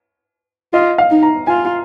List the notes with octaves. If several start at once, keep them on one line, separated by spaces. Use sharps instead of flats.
F4 D#5
F5
D#4
A#5
F4 G#5